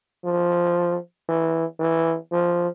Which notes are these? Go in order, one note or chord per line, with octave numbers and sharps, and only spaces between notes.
F3
E3
E3
F3